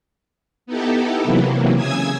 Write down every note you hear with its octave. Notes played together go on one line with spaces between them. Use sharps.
B3 D#4 E4 G4 A4
C3 E3 F#3 A#3
C#3 G#5 D#6 E6 G#6